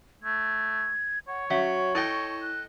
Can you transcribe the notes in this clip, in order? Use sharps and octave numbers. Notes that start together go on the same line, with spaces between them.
A3 G#6
C#5 F#5
F#3 C#4 E5 C#6 B6
E4 A4 D#5 G5
F#6